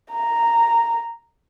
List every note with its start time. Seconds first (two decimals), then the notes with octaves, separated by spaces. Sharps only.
0.13 A#5